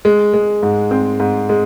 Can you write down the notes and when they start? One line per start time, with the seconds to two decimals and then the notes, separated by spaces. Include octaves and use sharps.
0.05 G#3
0.34 G#3
0.63 G#2
0.91 C4
1.20 G#2
1.49 G#3